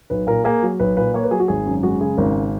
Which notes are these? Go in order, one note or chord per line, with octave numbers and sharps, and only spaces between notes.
B1 B4
A#2 A#4
A#3 G#4
F#3
B1 B4
A#2 B4
A#3 C#5
B4
F#3 G#4
F#4
G#1 G#4
F#2
G#3 F#4
C#3 G#4
G#1 A#4